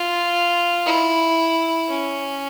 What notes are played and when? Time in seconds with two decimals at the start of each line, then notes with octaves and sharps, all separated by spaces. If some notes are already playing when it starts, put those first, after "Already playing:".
Already playing: F4
0.86 E4
1.88 C#4